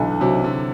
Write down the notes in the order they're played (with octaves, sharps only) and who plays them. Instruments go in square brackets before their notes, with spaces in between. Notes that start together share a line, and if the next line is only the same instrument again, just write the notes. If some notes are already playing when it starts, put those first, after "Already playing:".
Already playing: [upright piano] B1 [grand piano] D3 E3
[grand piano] C3 [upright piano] F#3
[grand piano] D3